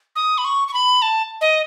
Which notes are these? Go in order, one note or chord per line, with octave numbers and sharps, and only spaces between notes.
D#6
B5
C#6
C#6
B5
A5
D#5